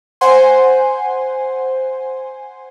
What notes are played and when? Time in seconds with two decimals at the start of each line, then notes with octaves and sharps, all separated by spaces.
0.21 C5 F#5 G#5 C6